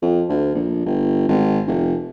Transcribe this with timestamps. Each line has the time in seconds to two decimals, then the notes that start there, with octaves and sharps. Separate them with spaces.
0.02 F2
0.29 D2
0.55 A#1
0.86 G1
1.28 G#1
1.67 F1